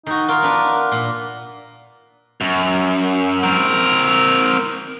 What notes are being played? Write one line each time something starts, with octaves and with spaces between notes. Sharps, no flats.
D#3 D#4 F#4
F4 A#4
B3 D4 B4
A#2
F#2
C4 A#4